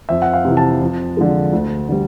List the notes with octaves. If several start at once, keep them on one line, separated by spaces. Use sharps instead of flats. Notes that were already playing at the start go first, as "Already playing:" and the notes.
F2 E5
F#5
F5
C3 E3
A5
F2
D3 F3 G#3
D2
D3 G3